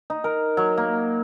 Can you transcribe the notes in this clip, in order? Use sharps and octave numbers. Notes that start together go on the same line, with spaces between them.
D#4
A#4
F#3
A#3